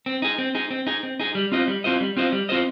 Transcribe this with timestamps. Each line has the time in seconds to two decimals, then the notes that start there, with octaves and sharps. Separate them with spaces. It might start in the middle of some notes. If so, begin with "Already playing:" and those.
0.06 C4
0.22 D#4 G#4
0.38 C4
0.55 D#4 G#4
0.71 C4
0.87 D#4 G#4
1.03 C4
1.20 D#4 G#4
1.35 G3
1.52 C4 F4 C5 D#5
1.68 G3
1.84 C4 F4 C5 D#5
2.01 G3
2.17 C4 F4 C5 D#5
2.32 G3
2.49 C4 F4 C5 D#5